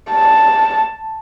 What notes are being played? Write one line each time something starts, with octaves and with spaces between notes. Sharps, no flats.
A5